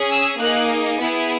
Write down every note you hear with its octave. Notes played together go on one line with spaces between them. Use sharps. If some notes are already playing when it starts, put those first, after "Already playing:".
Already playing: C#4 G#4
E6
A#3 D#4 G#4 F#6
B3 E4 G#4